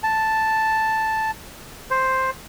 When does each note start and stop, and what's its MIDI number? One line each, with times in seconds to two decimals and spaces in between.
0.03 1.31 81
1.91 2.30 72